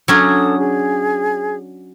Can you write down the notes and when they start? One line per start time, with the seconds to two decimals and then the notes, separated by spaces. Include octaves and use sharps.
0.08 F#3 C#4 D4 A4 D#6
0.57 G#4